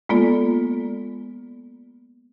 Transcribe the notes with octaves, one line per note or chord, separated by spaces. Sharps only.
G#3 A#3 B3 F4 A4 D5